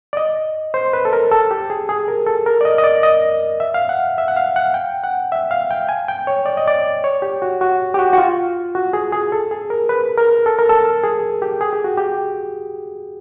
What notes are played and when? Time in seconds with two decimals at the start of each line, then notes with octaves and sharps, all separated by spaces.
0.13 D5
0.17 D#5
0.74 C5
0.93 B4
1.05 A4
1.13 A#4
1.31 A4
1.51 G4
1.70 G#4
1.89 G#4
2.08 A#4
2.26 A4
2.46 A#4
2.61 D5
2.65 D#5
2.78 D#5
2.84 D5
3.03 D#5
3.60 E5
3.74 F5
3.89 F#5
4.18 E5
4.28 F#5
4.37 F5
4.56 F#5
4.74 G5
5.04 F#5
5.32 E5
5.51 F5
5.71 G5
5.89 G#5
6.08 G5
6.27 C#5
6.46 D5
6.57 D#5
6.68 D5
7.04 C#5
7.22 G4
7.42 F#4
7.61 F#4
7.94 G4
7.99 F#4
8.13 F#4
8.18 F4
8.75 F#4
8.93 G#4
9.12 G#4
9.32 A4
9.51 G#4
9.70 A#4
9.89 B4
10.18 A#4
10.46 A4
10.59 A#4
10.69 A4
11.04 G#4
11.42 G4
11.61 G#4
11.73 G4
11.84 F#4
11.97 G4